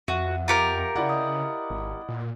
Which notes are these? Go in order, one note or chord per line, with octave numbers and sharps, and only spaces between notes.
F2 F#4 E5 F#5 D#7
F4 G4 A#4 A#5 C#7 D7
C#3 E4 D5 F#5
D#5 D#6
G#1
A#2